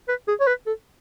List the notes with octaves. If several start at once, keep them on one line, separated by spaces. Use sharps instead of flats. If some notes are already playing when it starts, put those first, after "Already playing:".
B4
G#4
C#5
B4
A4